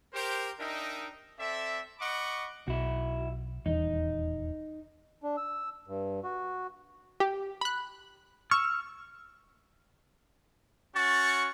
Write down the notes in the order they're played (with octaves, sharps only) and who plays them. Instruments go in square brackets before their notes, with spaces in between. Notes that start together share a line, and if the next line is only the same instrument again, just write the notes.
[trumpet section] G4 A#4 C5
D4 D#4 A#4 D#5 E5 G5
C4 A4 D5 E5
D#5 F#5 B5 C#6 D6
[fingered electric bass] B1 [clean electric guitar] E4 F#4
[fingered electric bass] D#1 E2 [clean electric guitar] D#4
[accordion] D4
E6
G2
F#4
[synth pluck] G4
B5 F#6
[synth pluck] C#6 [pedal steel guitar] E6 F6
[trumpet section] C#4 F#4 C#6 [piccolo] A6